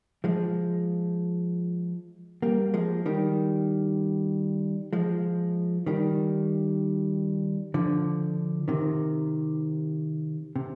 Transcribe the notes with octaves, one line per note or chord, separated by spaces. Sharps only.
F3 G#3
G3 A#3
F3 G#3
D#3 G3
F3 G#3
D#3 G3
D3 F3
C3 D#3
C3